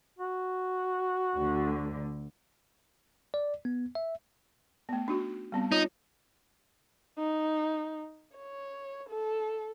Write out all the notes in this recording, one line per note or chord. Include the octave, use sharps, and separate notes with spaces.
F#4
D2 D3
D5
B3
E5
A3 B3
D4 D#4 F#4
G3 B3 C4
D#4 F4 C#5
D#4
C#5
A4